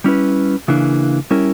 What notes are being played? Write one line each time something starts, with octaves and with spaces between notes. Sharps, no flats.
G3 C#4 E4 B4
C#3 E3 A#3 D4
G3 C#4 E4 A#4